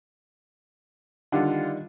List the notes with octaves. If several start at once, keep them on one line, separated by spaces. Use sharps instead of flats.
D3 D#3 G3 F4 F#5